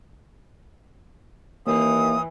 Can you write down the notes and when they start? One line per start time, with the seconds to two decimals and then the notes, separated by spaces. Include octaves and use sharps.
1.67 D#2 E3 A#3 E5 F5 D#6